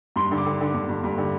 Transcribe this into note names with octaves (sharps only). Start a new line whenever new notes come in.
G2 C6
D3
D6
D3
D3
G2
G2
G2
D3